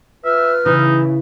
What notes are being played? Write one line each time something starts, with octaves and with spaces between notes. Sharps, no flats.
F4 B4 E5 F6
C#3 E3 D#4